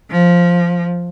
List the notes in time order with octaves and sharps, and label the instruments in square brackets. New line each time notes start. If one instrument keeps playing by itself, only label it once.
[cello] F3